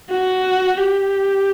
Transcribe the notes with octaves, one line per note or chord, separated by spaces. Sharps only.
F#4
G4